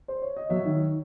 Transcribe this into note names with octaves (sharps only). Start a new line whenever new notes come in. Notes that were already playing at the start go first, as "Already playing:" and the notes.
C5
C#5
D#5
F#3 C#5 E5
D#3